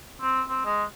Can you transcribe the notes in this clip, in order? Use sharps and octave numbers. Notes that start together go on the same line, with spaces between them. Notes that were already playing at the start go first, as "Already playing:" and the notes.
C4
C4
G#3